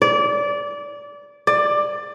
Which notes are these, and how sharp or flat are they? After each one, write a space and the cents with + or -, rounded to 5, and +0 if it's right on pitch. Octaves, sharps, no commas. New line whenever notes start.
D5 -20
D5 +15